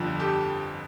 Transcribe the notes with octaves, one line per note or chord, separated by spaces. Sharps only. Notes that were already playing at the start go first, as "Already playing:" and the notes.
Already playing: G1 F2 D3 F3
G4 A4